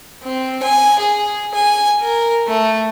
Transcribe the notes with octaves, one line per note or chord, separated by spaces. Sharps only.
C4
G#5
G#4
G#5
A#4
A3